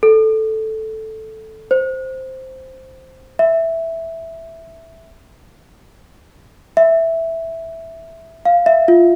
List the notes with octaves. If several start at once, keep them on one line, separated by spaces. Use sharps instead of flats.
A4
C5
E5
E5
F5
E5
F4